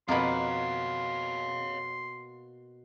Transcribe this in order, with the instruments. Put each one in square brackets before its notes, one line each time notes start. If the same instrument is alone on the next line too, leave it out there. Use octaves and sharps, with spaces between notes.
[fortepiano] F2 B5 [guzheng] B2 A#3 [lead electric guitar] C#5 F5 [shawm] C6